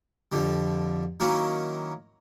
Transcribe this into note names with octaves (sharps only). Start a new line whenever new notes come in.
F2 D3 G3
D#3 F#3 A#3 C#4 E4